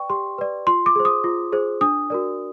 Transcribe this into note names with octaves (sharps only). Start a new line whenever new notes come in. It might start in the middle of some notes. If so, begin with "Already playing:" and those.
Already playing: B4 D5 G5 C#6
G4 C6
B4 D5
F4 C6
D6
G#4 C5
D#6
F4
G#4 C5
D4 D#6
F#4 A#4 D5